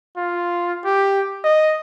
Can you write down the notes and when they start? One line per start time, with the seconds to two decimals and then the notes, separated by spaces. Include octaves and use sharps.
0.17 F4
0.85 G4
1.44 D#5